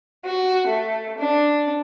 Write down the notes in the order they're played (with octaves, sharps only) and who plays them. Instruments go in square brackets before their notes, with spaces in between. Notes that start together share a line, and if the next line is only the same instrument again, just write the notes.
[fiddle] F#4
A3
D4